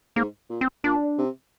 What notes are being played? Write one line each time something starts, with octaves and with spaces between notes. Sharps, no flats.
G#2 A#3
A#2
C4
A#2 D4
C3